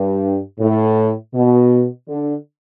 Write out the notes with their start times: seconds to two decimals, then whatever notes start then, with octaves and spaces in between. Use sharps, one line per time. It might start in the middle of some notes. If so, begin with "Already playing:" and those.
Already playing: G2
0.59 A2
1.34 B2
2.08 D3